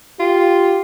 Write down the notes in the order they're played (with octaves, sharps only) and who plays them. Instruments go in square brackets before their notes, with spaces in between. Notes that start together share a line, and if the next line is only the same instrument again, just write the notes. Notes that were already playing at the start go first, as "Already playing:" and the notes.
[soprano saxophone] F4 [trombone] G4